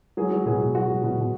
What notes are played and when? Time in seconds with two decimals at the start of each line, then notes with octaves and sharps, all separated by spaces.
0.17 F#3 G#4
0.31 F#3
0.46 B2 G#4
0.60 B2
0.75 F#3 F#4
0.89 F#3
1.03 B2
1.18 B2